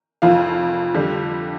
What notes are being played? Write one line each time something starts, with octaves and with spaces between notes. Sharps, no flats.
F1 F2 F3 F5
F2 D3 G3